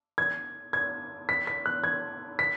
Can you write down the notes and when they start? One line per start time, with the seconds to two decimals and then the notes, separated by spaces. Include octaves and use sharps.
0.18 G#6
0.73 G#6
1.29 B6
1.47 B6
1.66 F#6
1.84 G#6
2.39 B6